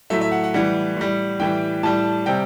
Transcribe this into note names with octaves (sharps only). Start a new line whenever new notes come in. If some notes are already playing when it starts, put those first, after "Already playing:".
A2 F#3 A3 E5
E5
F#5
F#5
A2 E3 G3 F#5
A2 G3
A2 E3 G3 G5
A2 G3 A5
C3 G3 G5